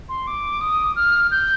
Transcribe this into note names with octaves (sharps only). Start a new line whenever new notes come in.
C6
D6
D#6
F6
G6